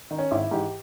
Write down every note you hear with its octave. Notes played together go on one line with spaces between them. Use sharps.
D#3
C#4
G#1 E4
G#2 E3 G4